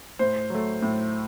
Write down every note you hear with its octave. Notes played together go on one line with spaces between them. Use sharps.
A2 C5
F#3 A3
A2